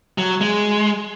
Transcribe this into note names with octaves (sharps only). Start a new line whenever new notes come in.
F#3
G#3